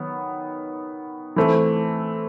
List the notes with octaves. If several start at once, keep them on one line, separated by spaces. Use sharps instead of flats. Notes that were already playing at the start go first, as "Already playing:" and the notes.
Already playing: D#3 F#3 B3
E3 A3 C4